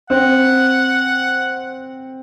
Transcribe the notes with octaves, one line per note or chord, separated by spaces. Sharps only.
C4 F#5